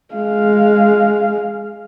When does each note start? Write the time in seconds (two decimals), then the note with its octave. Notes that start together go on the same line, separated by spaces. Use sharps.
0.14 G#3 F5